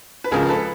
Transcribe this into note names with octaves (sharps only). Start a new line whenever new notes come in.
B4
C#2 C#3 F3 G#4 A#4
A4 B4